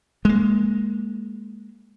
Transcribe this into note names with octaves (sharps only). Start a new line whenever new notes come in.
G#3 A#3